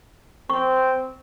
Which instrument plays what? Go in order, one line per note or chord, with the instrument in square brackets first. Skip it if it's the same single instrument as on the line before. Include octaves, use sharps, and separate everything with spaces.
[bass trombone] C4 [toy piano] C#6